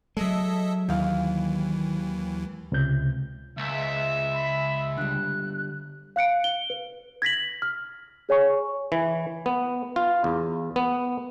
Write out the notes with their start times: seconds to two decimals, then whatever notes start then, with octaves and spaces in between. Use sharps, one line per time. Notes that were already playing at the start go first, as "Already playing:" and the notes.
0.17 F#3 G#3 A4 D#5 E5
0.89 D#2 D#3 E3 F5
2.72 C#2 C3 G6
3.57 C#2 E5
4.34 B5
4.98 D3 G3 F#6
6.16 F5 F#6 C#7 D7
6.44 G7
6.70 B4
7.22 G#6 A#6 B6 F#7
7.62 F6
8.29 G#4 C#5 G#5 C#6
8.92 E3
9.46 B3
9.96 F4
10.24 E2
10.76 B3